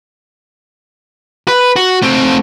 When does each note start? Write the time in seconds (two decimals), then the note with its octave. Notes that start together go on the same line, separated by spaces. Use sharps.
1.48 B4
1.76 F#4
2.02 A3 C4